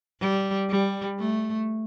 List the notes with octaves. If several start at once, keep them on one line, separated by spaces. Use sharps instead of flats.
G3
G3
A3